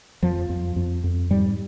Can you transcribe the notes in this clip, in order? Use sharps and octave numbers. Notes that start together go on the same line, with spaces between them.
F2 F3
F2
F2
F2
G#2 G3